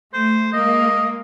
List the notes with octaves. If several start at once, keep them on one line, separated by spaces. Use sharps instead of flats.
A3 C5
G#3 A#3 D#5